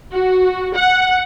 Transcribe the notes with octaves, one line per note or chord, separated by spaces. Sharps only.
F#4
F#5